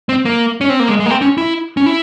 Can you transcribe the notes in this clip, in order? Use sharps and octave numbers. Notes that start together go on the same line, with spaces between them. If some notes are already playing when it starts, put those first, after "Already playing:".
C4
A#3
C#4
C4
A#3
G#3
G#3
A#3
C4
C#4
E4
C#4
E4